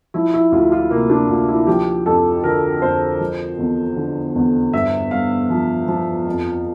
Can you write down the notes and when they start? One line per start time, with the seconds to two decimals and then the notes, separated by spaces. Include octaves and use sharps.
0.14 F3 E4
0.34 E4
0.52 D2 F4
0.72 F4
0.91 C3 A#3
1.10 D4
1.29 D2 F4
1.48 E4
1.67 F3 G4
2.06 F2 A4
2.44 D3 A#4
2.82 F2 C5
3.20 F3
3.59 E2
3.96 D3
4.35 E2
4.73 G2 E5
5.11 G2 F5
5.50 F3
5.88 F3
6.26 F2